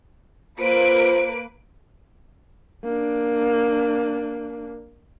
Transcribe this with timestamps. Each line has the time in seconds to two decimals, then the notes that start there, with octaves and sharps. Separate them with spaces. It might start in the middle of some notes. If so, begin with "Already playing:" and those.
0.60 A#3 F4 B4 C5 D7
2.84 A#3 D4